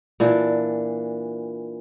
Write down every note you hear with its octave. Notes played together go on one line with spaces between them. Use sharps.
A#2 E3 D4